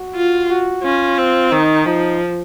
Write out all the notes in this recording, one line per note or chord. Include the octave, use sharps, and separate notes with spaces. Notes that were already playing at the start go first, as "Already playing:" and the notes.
Already playing: F#4
F4
F#4
C#4 F4
C4
D#3 D#4
F3 D#4